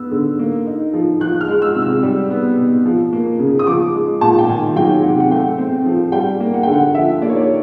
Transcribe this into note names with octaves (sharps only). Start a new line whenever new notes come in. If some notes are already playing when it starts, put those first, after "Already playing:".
Already playing: B3 E6
D3
A#3
D#4
F3
F3 F#6
F6
G#3
E6
C3
E6
G3
B3
B2
F3
A#3
C#3
D#6
F3 D6
G#3
A#2 A5
G5
D#3 G#5
F#3 G5
C3 F#5
F#5
A3 G5
C4
F3
G3 G5
A#3
F#5
D3 G5
F#5
F3 E5
A#3 D5
C#5
D5